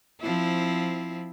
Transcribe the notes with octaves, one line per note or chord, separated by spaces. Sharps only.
F3 C4 E4